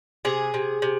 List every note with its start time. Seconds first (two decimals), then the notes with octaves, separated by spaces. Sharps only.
0.25 C3 G#4
0.54 C3
0.82 C3